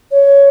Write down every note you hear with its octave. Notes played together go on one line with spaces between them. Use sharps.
C#5